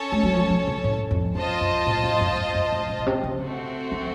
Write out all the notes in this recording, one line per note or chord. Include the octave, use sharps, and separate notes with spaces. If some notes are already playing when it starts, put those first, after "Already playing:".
Already playing: C#4 A4 C#5 A5
A3
F#3
F3
D#3
C#3
A2
F2
F2 F4 C5 D#5 A5
F#2
A2
A2
F#2
F2
F#2
A2
A2
A#2
C3
C#3
A3 C4 F#4
D#3